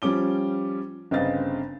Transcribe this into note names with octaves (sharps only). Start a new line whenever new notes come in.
F3 G3 C#4 D6 G7
G1 C#3 C4 D#5 F5 A6